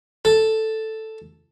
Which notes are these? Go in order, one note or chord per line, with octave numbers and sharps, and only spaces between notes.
A4